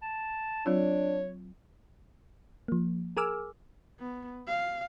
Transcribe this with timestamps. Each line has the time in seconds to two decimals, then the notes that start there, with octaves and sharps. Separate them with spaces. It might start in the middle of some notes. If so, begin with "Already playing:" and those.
0.02 A5
0.66 F#3 C4 D4 F4 C#5
2.68 F3 A#3
3.17 G#4 A#4 G#5 D6 E6 F6
3.99 B3
4.47 F5